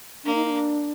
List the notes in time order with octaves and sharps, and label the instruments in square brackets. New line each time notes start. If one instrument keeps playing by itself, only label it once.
[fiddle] A#3 [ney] D4
[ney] D#4
D#4
D4